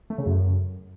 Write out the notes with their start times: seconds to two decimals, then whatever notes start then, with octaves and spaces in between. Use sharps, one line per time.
0.10 A3
0.18 C#3
0.26 F#2